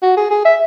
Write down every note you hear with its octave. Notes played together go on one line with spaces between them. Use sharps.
F#4
G#4
G#4
E5